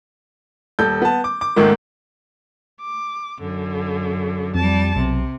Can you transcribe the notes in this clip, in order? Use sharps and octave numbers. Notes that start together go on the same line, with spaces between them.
D#1 A4 G6
B3 A5
D6
D6
C#2 G#2 D#3 A3 A#3
D6
F#2 D3
F2 G3 A5
B1 C3